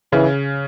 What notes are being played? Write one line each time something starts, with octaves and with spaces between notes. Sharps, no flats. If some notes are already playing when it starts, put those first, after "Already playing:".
C#3 E3